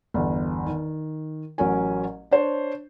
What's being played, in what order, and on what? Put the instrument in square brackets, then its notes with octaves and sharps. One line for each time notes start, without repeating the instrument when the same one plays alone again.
[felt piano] G1 E2
D#3
A1 F#3 C#4 A#4 G#5
D4 C5 C#5